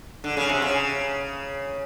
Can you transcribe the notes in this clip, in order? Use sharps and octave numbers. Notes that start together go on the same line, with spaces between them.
D3
C#3
C3
C#3